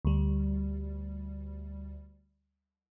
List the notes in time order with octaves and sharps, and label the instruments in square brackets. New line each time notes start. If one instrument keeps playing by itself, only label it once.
[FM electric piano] D2 G3